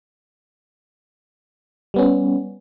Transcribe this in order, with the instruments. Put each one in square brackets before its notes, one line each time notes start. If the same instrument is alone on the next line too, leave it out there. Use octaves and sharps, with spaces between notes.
[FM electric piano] G3 B3 C#4